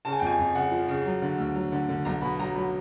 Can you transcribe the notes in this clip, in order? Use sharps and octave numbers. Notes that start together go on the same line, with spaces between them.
C#3 A5
G#5
F2 G5
G#5
F2
C#3 F#5
F3
C#3
F#3
D3
D2
F#3
D3
D3
B1 A#5
B2 B5
F#3 A#5
F#3 B5